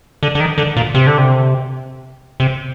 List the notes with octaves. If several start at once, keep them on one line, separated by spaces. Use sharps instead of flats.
D3
D3
D#3
D3
A#2
C3
D3
C3
C3